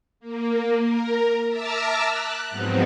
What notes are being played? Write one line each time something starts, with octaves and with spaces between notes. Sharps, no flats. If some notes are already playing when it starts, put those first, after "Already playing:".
A#3
A#4
E5 A5 A#5 D6 E6 F6
F#6
G#2 F3 F#3 B3 C4 D#4